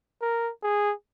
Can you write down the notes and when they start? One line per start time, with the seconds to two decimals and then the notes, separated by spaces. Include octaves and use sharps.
0.22 A#4
0.63 G#4